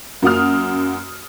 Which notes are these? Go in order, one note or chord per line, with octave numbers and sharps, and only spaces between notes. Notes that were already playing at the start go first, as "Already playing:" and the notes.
F#2 A#3 F#4 D#6 F6